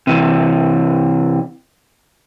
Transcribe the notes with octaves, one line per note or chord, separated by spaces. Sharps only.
C3 E3